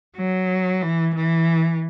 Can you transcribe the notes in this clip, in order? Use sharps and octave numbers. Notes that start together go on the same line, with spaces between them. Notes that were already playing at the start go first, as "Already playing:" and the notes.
F#3
E3
E3